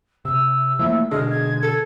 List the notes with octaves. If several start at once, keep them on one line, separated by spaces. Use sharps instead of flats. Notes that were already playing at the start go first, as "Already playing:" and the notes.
C3 E6
F3 A3 A#3 E4
B2 D3 G#3 D4 F6
G#6
A4